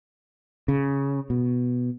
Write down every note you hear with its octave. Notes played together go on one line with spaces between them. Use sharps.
C#3
B2